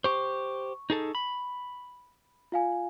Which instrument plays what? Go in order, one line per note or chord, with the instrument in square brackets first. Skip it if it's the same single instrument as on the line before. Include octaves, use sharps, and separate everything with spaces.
[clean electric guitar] G4 C5 [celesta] C#6
[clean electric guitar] D#4 G#4 A4
B5
[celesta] F4 F5 G#5